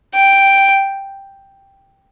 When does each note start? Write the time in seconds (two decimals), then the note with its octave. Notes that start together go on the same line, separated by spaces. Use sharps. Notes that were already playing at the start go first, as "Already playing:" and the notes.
0.14 G5